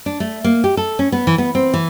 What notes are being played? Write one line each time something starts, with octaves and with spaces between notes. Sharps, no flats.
D4
A3
A#3
G4
A4
C#4
B3
E3
B3
C4
E3